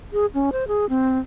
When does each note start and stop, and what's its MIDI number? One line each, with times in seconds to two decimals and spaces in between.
0.13 0.26 68
0.34 0.50 61
0.52 0.67 72
0.68 0.88 68
0.89 1.18 60